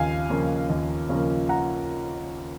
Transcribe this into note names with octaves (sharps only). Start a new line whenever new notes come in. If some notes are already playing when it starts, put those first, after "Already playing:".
Already playing: D#2 C#3 F3 A#3 F5 G#5
C#3 F3 A#3
D#2
C#3 F3 A#3
F#5 A#5